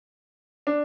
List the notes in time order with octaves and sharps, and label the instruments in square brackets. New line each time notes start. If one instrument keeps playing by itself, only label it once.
[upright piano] D4